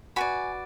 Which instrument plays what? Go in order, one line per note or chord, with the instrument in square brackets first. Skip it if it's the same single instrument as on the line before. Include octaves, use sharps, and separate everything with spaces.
[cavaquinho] F#4 B4 D5 G#5 B5